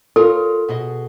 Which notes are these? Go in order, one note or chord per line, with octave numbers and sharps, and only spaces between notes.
F4 A4 A#4 C#5
B2 G#4 D#5